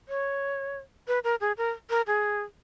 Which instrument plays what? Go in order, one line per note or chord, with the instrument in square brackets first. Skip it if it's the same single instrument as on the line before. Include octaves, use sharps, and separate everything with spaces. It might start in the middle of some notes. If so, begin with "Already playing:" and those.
[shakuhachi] C#5
B4
A#4
G#4
A#4
A#4
G#4